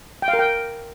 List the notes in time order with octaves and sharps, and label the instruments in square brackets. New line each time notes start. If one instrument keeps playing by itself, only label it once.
[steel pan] G5
F5
A#4
G5